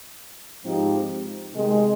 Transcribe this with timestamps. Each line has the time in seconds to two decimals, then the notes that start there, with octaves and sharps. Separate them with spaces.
0.65 G#2 F3 C4 D#4 G4
1.55 C3 D#3 G#3